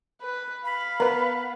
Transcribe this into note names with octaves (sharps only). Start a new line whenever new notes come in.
B4
F5 B5
B3 A#4 B4